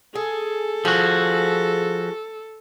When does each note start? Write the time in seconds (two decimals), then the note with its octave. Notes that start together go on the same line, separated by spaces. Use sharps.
0.15 G#4 A4
0.85 F3 F#4 G#4